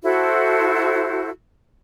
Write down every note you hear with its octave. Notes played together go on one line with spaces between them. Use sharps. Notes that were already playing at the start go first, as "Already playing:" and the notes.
E4 F#4 A4 C5